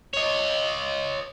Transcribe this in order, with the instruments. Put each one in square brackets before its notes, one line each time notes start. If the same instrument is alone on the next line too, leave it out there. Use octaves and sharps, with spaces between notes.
[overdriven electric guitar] C#5 D#5